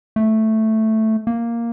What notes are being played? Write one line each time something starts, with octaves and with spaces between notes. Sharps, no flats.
A3
A#3